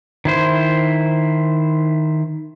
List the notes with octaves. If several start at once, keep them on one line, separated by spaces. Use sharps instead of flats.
D#3 E4 C5